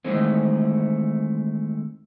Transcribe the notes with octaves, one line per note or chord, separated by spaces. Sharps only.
D#3 E3 G#3 A3 C4